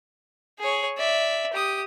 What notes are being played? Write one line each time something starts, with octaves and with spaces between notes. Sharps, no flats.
G#4 C#5
D5 E5
G4 D#6